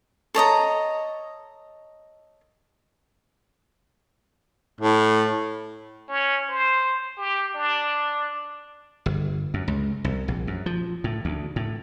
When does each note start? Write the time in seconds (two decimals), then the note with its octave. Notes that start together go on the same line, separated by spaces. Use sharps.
0.35 A4 C#5 D#5 A#5
4.81 A2
6.08 C#4
6.49 C5
7.17 G4
7.54 D4
9.06 G1
9.54 F#2
9.68 C#2
10.05 C2
10.28 A#1
10.47 F#2
10.66 F3
11.04 A2
11.25 D2
11.56 A2